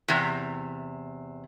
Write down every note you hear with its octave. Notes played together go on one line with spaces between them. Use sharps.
E2 C3